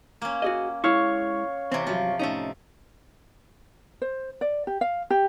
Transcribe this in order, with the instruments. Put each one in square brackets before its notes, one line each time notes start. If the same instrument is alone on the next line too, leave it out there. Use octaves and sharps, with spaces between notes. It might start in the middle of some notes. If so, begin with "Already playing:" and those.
[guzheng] A#3 C#4
[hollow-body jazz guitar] F#4 G#4 D#5
[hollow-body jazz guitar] G#3 E4 [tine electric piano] C#5 F5 C#6
[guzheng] C3 E3 [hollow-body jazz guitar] C4
[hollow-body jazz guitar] G2 F#3 [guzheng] F3
[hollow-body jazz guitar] A2 C#4 D#4 [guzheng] A3 A#5
[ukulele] C5
D5
G4
F5
G4